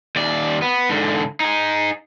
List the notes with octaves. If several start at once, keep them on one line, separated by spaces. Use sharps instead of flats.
D#2 D5
B3
G#2 D3
D#4 G#4